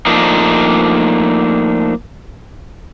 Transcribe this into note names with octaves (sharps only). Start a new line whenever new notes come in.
F3 A3 A#3 D4 D#4